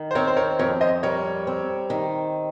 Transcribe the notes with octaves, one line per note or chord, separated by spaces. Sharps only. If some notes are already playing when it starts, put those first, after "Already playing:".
Already playing: D#3
C5
C4 A#4 C#5
C5
A#4 C#5
F2 A#4 C#5
C5 D#5
G3 A#4 C#5
C4
D#3